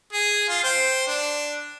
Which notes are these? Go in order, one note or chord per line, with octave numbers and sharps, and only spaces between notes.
G#4
F4
C5 G5
D4